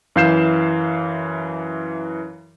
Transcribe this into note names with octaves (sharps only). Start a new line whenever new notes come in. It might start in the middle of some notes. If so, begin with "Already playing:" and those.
F#2 E3 F5 G6 C7 E7